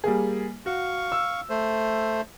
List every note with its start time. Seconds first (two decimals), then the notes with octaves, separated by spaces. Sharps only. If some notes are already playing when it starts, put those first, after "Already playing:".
0.04 G3 A#3 G#4
0.66 F#4 F5 C#6
1.12 E6
1.50 A3 C5